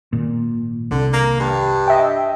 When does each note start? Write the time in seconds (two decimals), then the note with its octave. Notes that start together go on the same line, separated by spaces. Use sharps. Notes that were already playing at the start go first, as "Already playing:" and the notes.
0.13 G#1 A#2
0.91 C2 D3
1.13 A#3
1.39 G2
1.88 D#5 E5 G5